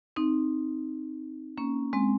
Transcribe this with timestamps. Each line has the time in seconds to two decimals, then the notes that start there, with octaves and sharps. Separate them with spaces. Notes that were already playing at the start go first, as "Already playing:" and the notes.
0.16 C4 D#4
1.57 A#3 C#4
1.93 G#3 C4